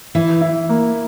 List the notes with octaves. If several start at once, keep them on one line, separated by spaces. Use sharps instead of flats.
E3 E4
E4
A#3